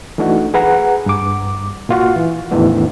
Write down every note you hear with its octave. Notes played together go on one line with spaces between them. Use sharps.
E3 A3 D4 D#4 F#4
G#4 B4 F#5 A#5
G2 D6
A#2 F4 F#4
E3
E2 A2 D#3 E3 B3 D4